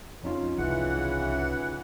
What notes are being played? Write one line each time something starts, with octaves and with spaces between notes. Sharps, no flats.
F2 C#4 D#4 F4
C2 C#3 E3 F#5